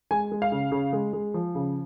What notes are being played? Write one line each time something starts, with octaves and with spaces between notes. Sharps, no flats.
G#3 G#5
G#3
F5
C#3
C#3
G#3
G#3
F3
C#3